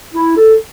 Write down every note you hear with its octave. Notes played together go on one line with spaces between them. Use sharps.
E4
A4